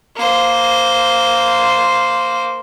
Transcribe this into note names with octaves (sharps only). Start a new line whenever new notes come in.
A#3 C5